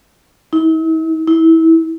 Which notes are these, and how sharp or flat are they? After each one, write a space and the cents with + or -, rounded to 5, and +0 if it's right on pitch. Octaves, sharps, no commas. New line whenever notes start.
E4 -45
E4 -25